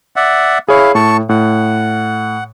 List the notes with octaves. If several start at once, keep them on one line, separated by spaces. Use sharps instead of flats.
D5 E5 F#5
E4 G#4 C#5 F5
A2 A5 C#6
A2 F#5